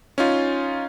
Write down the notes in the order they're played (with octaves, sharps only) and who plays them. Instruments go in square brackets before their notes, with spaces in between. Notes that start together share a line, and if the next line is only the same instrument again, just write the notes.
[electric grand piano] C#4 D#4 F4